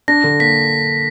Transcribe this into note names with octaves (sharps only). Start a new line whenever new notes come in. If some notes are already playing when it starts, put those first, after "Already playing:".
D4 A#6
D3
A#3 B6